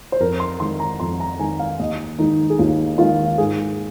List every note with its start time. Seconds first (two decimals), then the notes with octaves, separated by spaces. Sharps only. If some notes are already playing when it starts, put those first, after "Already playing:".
0.12 C5
0.20 F2 A#4
0.40 C6
0.60 D#3 G#3 C6
0.80 A#5
1.00 F2 C6
1.20 A#5
1.39 D#3 G#3 G#5
1.59 F5
1.79 D#2 D#5
2.19 D#3 G#3 D#4
2.50 G#4
2.59 D#2 F4
2.98 D#3 G#3 F4
3.38 G#2 G#4